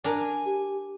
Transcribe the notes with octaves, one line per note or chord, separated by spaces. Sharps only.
D4 A#4 G#5
G4